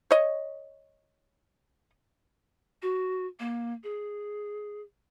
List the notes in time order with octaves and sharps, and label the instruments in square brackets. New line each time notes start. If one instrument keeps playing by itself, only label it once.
[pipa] C#5 D#5
[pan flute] F#4
A#3
G#4